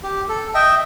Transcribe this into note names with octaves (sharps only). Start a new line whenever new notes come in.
G4
A4
D#5 E5 G5